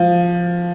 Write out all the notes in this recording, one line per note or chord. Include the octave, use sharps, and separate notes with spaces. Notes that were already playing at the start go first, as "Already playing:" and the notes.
Already playing: F3